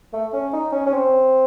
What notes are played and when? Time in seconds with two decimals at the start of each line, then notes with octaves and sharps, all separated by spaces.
0.13 A3
0.33 C#4
0.53 D#4
0.72 C#4
0.86 C#4
0.93 C4